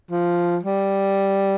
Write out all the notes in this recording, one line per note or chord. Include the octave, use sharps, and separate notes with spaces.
F3
G3